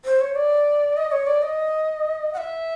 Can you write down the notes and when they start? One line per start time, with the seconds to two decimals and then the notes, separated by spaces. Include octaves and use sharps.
0.05 C5
0.21 C#5
0.36 D5
0.97 D#5
1.12 C#5
1.27 D5
1.42 D#5
2.33 F#5
2.38 E5